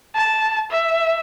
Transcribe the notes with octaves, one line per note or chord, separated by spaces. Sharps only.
A5
E5